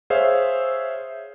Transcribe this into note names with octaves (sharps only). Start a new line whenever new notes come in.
G#4 C5 C#5 E5 F5